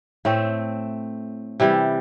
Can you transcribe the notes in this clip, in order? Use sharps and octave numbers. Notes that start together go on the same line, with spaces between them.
A2 A3 C4
C3 E3 G3